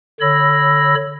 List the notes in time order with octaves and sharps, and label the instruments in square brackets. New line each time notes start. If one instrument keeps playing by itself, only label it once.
[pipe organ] D3 C#5 B5 E6 A#6